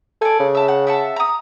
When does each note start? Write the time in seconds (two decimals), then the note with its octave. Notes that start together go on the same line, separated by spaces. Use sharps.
0.22 A4 D5 G#5
0.40 C#3
0.55 E5 A5
0.68 F#5
0.87 E5 F#5 A5
1.16 A#5 D#6